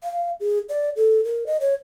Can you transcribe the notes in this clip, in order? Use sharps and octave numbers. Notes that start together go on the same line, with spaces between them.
F5
G#4
D5
A4
A#4
D#5
C#5